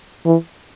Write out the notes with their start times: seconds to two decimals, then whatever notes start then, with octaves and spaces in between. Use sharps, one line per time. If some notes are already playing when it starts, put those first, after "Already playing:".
0.25 E3